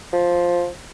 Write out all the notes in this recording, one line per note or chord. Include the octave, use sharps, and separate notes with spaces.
F3